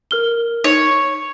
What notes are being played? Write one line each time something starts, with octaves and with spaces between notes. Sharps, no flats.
A#4 F6 G7
D#4 C#5